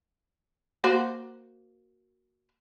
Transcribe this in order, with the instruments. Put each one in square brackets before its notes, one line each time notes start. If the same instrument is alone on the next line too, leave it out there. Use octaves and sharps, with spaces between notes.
[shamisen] A#3 F#4 C5